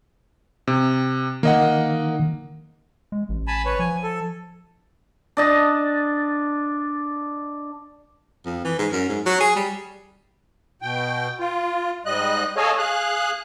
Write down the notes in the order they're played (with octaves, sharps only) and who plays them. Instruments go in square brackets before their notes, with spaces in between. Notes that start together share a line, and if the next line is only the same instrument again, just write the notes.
[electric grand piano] C3
[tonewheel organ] D#3 [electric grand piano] A#3 D#5 F#5
[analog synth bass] G#3
A1
[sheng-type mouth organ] G#5 A5 B5
B4 C#5
[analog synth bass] F3 [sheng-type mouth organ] G#5
[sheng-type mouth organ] A4
[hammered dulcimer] D4 D#5 A5
[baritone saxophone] F2
E3
G#2
F#2
G#2
F#3
G#4
G3
[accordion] B2 G5
F4
G#2 G3 D#5 F#6
G#4 A4 C#5 D#5 F5 G#5
G#4 F5 F#6